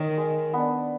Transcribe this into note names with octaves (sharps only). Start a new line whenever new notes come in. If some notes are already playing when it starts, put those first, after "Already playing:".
Already playing: D#3 A#4 C#5
G#3
B3 D4